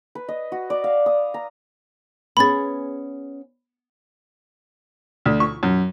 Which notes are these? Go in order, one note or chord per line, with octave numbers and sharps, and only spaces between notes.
B4
D#5
F#4
D5
F5
D#6
A#5
B3 C#4 G#4 B5 A6
D2
C#6
F#2